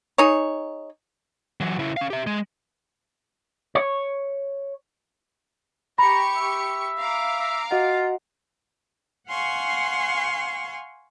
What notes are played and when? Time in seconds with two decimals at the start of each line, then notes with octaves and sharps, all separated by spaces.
0.18 D#4 G#4 C#5
1.61 E3 F#3
1.79 C#3 E4
1.97 C#4 F5
2.10 G4 E5
2.27 G#3
3.75 C#5
5.98 G4 A#5 B5 C#6 C#7
6.36 E5
6.99 F5 A#5 D6
7.40 E5
7.71 F4 F#4 D#5 F#5
9.29 F5 F#5 G#5 C6 C#6